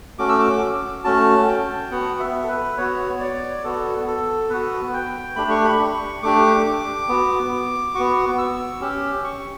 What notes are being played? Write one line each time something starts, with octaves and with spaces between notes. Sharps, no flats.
A3 C#4 F#4 D6
E6
D6
A3 C#4 F#4 A5
G5
B3 F#4 F#5
E5
A4
B4
B3 F#4 C#5
D5
B3 F#4 A4
A4
B3 F#4 B4
G5
A3 D4 G4 B5
C#6
B5
C#6
A3 D4 G4 D6
D6
B3 F#4
B3 F#4 C#6
E6
C#4 G4
C#6